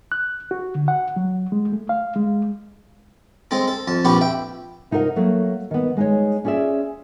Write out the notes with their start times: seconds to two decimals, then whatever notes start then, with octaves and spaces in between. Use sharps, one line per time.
0.12 F#6
0.51 F#4
0.75 D3
0.88 F#5
1.16 F#3
1.52 G#3
1.72 A3
1.89 F5
2.16 G#3
3.51 G#3 C4 A4
3.68 A4
3.88 F2 A5
4.05 A#1 F2 G4 B4 F#5 C#6
4.21 E5 G5
4.91 C3 D#4 F4 A#4 F#5
5.16 F#3 A3 A#3
5.71 D#3 B3
5.97 G#3 D#4 C#5
6.45 C#4 F4 G#4 D5 E5